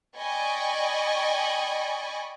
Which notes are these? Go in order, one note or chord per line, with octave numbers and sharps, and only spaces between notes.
D5 D#5 G5 G#5 B5 C#6